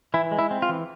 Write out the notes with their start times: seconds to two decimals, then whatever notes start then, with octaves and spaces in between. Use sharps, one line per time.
0.14 E3 E4
0.31 G#3
0.39 E4
0.51 C4
0.62 F4
0.69 E3